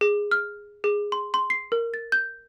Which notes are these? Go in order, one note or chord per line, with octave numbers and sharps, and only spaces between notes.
G#4
F6
G#4
C6
C6
C7
A#4
A6
G6